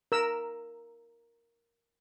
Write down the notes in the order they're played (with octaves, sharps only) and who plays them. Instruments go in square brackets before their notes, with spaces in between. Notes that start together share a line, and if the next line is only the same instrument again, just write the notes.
[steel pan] A#4 E6